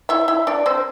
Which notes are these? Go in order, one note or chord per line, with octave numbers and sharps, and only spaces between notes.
E4 E5
E4 E5
D4 D5
C4 C5